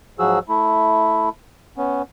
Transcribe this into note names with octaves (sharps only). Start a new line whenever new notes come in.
G#2 F3 F#3 F#4 G#4 E6
A3 E4
B3 C#4